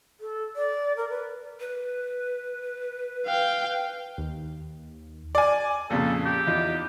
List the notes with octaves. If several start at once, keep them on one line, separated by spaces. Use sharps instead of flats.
A4
D5
A#4
B4
B4
F5 G5
D#2
D5 G#5
F2 A#2 C#3 A4
G4
E2 D#4 F4